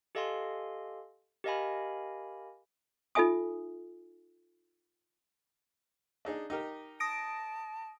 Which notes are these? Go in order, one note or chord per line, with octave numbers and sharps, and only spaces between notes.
G4 A4 D#5 F5 G#5 C6
G4 A#4 D#5 F5 G#5 B5
D#4 F4 A4 E5 G#5 D#6
D4 D#4 G#4
D#4 G4 A#4
A5 D#6 A#6 D7